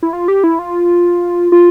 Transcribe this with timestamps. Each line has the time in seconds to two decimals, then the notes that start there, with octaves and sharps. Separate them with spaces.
0.03 E4
0.13 F4
0.28 G4
0.44 E4
0.59 F4
1.52 F4